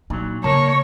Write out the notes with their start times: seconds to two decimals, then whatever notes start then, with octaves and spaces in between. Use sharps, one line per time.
0.10 A#2 F#3 D#4
0.44 C#3 A#3 A#4 C#5 A5